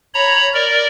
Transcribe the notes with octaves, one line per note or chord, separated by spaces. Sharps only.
C#5 A#5 B5
A#4 D5